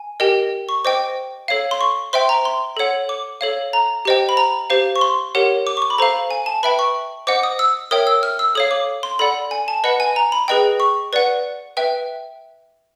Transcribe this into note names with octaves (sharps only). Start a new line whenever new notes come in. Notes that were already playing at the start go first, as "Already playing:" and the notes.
Already playing: G#5
G4 A#4 D#5 G5
C#6
C5 D#5 G5 D6
A4 C#5 F5
C6
C#6
C5 E5 G5 C6
A#5
C6
A4 C#5 F#5
D6
A4 C#5 F5
A#5
G4 C5 D#5 G5
B5
A#5
G4 C5 F5
C#6
C6
G4 A#4 C#5 F#5
D6
C#6
D6
B5
A4 C5 F5 A#5
G#5
A5
B4 E5 G5 B5
C#6
C5 D#5 F#5 D6
D#6
E6
A#4 C#5 E5 G5 D#6
E6
F6
E6
A4 C#5 F5 D#6
D6
C6
A4 D5 F#5 B5
G#5
A5
B4 D#5 F#5 B5
G#5
A#5
B5
G#4 B4 D#5 G5
C#6
B4 D5 F#5
B4 E5 G5